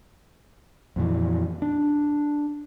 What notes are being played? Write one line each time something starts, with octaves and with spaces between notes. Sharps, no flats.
F2 A#2 E3
D4